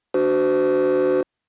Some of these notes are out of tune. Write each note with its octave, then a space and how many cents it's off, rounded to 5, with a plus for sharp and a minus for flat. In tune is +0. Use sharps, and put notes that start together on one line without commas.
D4 +0 F#4 +15 C5 -35